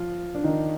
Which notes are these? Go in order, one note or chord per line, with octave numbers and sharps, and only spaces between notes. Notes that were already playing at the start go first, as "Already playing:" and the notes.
Already playing: F3 F4
D4
D#3 D#4